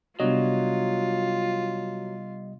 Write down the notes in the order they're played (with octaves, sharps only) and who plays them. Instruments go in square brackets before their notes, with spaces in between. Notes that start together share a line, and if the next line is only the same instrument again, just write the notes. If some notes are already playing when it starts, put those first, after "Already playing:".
[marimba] C3 B3 D4 [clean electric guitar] F#3 [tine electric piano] G3 D#5 [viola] F4